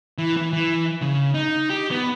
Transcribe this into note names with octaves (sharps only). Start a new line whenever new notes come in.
E3
E3
E3
C#3
D#4
G4
B3